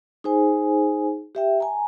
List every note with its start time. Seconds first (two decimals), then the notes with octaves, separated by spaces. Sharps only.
0.24 D#4 G#4 C5 G#5
1.35 G4 E5 G5
1.60 G#5 A#5